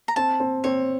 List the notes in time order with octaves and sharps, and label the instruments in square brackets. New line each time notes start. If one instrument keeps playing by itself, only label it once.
[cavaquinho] A#5
[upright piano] C4 [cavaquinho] A5
[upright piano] C4
[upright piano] C4 [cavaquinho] C#5